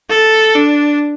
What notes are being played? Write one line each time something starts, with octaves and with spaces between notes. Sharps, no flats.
A4
D4